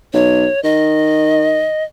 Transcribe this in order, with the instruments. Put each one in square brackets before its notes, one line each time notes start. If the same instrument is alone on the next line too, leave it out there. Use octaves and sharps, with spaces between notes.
[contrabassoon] B1 [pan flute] C#5
[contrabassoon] D#3 [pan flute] D#5